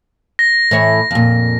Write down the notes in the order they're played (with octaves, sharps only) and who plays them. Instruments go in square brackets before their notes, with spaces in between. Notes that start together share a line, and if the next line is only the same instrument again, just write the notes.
[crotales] A#6
[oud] A2 E3 C#5
F2 A#2